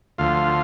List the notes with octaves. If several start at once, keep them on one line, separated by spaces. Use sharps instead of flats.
D2 D3 F3 F4 F5